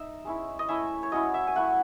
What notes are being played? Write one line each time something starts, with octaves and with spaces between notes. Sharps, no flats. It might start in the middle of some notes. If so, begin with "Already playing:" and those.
Already playing: D#4 E5
G#3 C#4 E4
D#5
A3 C#4 E4 E5
C#5
F#3 C#4 E4 D#5
E5
G#5
F#3 A3 E4 F#5